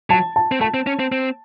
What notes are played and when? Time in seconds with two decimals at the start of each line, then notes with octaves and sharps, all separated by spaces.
0.10 F#3 A5
0.36 A5
0.52 C4
0.61 A3 A5
0.74 C4
0.87 C#4
0.99 C4
1.12 C4